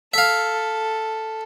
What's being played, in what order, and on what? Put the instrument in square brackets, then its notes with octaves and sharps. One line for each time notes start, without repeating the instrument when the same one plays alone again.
[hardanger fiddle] A4 [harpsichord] E5 F5